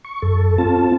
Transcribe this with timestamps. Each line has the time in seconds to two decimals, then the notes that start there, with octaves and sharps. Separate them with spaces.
0.05 C#6
0.22 F#2 A4
0.58 C4 F4 A5